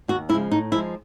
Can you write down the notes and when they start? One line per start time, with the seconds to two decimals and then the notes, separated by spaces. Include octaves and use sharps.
0.08 D#2 F#4
0.29 C#3 E4
0.32 F3 G#3
0.51 A2 D#4
0.72 F3 G#3 E4